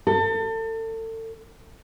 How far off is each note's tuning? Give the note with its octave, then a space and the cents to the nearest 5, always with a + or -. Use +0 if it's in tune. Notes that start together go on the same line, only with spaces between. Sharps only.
A4 +35